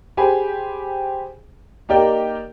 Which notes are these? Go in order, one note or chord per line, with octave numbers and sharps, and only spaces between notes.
G4 G#4 C5 G#5 B5
A#3 D#4 G4 A#4 D5 G5